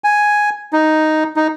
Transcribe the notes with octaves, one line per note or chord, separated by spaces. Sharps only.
G#5
D#4
D#4